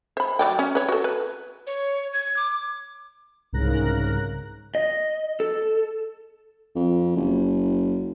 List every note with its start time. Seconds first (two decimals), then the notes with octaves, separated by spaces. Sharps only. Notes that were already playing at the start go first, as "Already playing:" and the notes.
0.17 C5 B5
0.39 F#3 D5 G5
0.59 C#4
0.75 B4 C#5
0.89 F#4 A4
1.04 B4
1.67 C#5
2.14 G#6
2.37 D6
3.53 C2 G#2 C#3 A#4 F#6 A#6
4.75 D#5
5.40 A4
6.76 F2
7.16 F#1